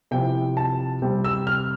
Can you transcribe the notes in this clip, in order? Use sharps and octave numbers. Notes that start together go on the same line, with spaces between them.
C3 F3 C4 E4 G5
A5
C3 G3 C4
E6
F6